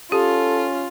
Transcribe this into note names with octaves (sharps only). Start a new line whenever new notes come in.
C#4 F4 G4 A4